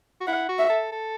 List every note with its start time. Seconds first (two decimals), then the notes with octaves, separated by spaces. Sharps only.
0.21 F#4
0.27 E4 F#5
0.49 F#4
0.59 E5
0.70 A4
0.92 A4